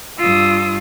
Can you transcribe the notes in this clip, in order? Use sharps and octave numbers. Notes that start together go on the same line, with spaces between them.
G2 F4 D#6 E6